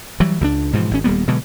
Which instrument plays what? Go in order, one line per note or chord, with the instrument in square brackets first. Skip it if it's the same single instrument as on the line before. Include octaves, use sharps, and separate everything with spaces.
[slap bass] E3 F#3 G3
C#2 G3 D4
G#2 B2 E3 F3
G#1 C#4
D#1 G3 A#3 B3
B2 D3 F#3 G#3